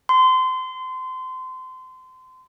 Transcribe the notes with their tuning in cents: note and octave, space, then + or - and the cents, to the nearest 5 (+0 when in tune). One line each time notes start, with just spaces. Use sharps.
C6 -25